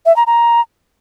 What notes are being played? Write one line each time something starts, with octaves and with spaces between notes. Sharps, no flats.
E5
A#5
A#5